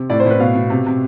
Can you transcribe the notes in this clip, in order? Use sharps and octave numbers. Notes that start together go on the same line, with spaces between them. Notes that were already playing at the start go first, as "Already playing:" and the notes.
Already playing: C3
A2 D5
C5
A2 B4
B2 F5
B2
C3
C3